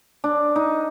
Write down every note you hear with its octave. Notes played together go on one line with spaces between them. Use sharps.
D4
D#4